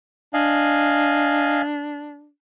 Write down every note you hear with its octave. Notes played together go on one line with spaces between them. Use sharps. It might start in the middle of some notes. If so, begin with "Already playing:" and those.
D4 D#5 F5 G#5